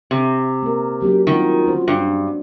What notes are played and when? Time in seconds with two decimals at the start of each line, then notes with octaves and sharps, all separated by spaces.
0.11 C3
0.63 A#3 A#4
1.02 F#3 A#3 C#4 G4
1.27 D#3 G3 C4 F4 F#4
1.66 C#4 F#4 C5
1.88 G2